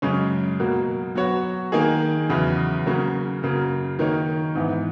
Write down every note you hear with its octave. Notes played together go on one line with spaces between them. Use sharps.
F#2 C#3 G#3 C#4
B2 F#3 A#3
F#3 B3 F#4 C#5
D#3 A#3 D#4 G#4
E2 C#3 F#3 B3
C#3 F#3 A#3 C#4
F#2 C#3 F#3 A#3
D#3 A#3 D#4 A#4 C#5
G#2 E3 B3